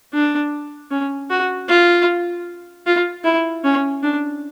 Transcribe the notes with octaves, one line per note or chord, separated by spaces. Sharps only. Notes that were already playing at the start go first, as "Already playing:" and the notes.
D4
C#4
F#4
F4
F4
E4
C#4
D4